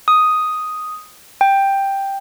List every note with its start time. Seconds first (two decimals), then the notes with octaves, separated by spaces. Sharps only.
0.08 D#6
1.41 G5